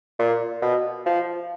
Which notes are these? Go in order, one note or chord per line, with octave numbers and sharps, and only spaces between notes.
A#2
B2
F3